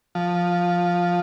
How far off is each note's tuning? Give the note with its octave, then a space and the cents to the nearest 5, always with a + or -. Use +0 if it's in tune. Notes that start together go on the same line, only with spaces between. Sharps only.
F3 +10